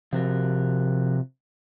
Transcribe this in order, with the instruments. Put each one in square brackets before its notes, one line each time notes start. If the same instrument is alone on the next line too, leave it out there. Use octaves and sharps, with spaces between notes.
[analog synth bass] C3 [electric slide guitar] F3 F#4 A#4